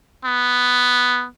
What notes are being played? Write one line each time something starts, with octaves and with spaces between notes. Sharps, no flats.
B3